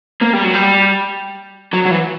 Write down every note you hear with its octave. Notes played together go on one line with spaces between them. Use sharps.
A#3
G3
F#3
G3
F#3
F#3
E3